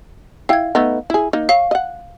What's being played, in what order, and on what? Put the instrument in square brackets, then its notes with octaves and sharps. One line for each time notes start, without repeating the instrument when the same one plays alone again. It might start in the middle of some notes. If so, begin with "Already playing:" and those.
[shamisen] E4 G5 [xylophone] F5 G#6
[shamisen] A3 B3 D#4
E4 G#4
A#3 D#4
[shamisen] C#5 [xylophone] F5
[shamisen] D#5 F#5